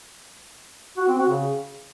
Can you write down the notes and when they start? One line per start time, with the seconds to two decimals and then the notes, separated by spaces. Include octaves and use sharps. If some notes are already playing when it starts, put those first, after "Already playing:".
0.97 F#4
1.07 C4
1.18 F#4
1.29 C#3